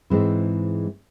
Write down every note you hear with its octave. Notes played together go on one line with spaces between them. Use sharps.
G#2 E3 G#3 C4 E4